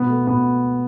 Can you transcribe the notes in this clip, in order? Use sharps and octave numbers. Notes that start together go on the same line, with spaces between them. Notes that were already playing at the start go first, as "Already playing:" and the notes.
Already playing: B2 B3
A3
B2 B3